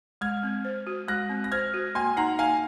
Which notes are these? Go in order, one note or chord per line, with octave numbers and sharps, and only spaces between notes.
G#3 F6 G#6
C4
C5
F#4
G#3 F#6 A#6
C4
A#6
C5 F6 G#6
F#4
A#3 G#5 C6
D#4 F#5 A#5
A#3 F5 G#5